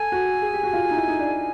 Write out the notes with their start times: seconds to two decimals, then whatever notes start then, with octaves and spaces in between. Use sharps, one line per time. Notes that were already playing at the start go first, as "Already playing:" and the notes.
Already playing: A4 G#5
0.12 F#4
0.42 G#4
0.53 G4
0.63 F#4
0.73 F4
0.91 D#4
0.96 E4
1.08 D#4
1.19 D4